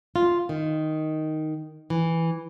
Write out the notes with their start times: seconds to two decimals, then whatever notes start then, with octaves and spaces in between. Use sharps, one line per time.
0.16 F4
0.49 D#3
1.90 E3